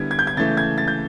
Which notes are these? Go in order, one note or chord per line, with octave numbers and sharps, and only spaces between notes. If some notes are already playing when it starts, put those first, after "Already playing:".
Already playing: D3 G3 B3 E4 G#6
G#6
G6
G#6
C#3 E3 A3 A6
G#6
A6
G6